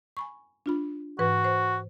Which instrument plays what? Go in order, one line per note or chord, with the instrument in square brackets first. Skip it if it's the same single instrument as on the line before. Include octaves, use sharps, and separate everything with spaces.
[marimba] G#5 B5 C#6
D4 F4 B5
[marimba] G#2 E3 B4 [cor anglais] F#4
[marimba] C5